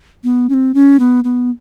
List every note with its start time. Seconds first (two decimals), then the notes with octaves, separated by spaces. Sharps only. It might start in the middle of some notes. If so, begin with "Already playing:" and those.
0.24 B3
0.49 C#4
0.54 C4
0.74 C#4
0.99 B3
1.24 B3